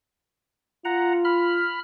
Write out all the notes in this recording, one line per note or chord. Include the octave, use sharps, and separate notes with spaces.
F4 F#5 A#5
B5 F6